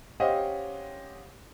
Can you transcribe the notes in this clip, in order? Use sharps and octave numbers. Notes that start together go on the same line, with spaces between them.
C#4 G4 C5 D#5 F5 F#5